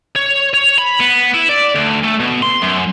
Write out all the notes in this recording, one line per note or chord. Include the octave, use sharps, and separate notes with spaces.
C#5
C#5
B5
B3
E4
D5
D2
A3
B2
C6
F#2